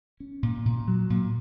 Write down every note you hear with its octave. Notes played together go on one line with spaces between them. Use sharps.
C#4
A#2
A#2
F#3
A#2